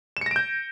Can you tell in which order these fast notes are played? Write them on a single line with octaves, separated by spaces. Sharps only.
E7 C#7 A#6 D7 G6